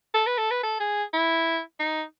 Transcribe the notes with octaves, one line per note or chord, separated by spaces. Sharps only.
A4
B4
A4
B4
A4
G#4
E4
D#4